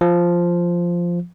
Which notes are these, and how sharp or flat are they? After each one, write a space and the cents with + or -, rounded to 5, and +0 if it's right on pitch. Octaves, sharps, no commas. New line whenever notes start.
F3 -5